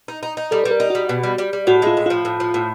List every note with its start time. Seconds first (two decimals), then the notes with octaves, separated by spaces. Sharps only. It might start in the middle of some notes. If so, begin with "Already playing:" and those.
0.08 D#4
0.23 D#4
0.37 D#4
0.51 G3 A4
0.64 G3 B4
0.71 A#4
0.80 D#4
0.90 G3 F#4
1.09 B2
1.23 G3
1.38 G3
1.53 G3
1.67 A2 F#4
1.82 G#3 F4
1.97 A2
2.06 F3 F4
2.25 A2
2.40 F3
2.54 A2